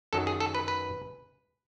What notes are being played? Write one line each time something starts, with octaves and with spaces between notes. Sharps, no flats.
F#2 D#3 F#3 A4
G#4
A4
B4
B4